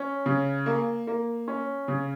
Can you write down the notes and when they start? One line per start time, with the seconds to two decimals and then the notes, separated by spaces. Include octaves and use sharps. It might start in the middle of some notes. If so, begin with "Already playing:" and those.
Already playing: C#4
0.26 C#3
0.66 A#3
1.07 A#3
1.48 C#4
1.88 C#3